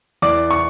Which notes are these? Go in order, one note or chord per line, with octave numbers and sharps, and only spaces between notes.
E2 D5 D6
C#6